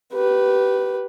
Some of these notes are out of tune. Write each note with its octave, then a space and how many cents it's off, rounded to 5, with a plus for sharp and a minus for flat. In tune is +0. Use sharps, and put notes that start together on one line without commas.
G4 -25 B4 -5